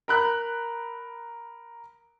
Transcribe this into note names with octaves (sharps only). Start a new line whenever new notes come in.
A#4 B5 F#6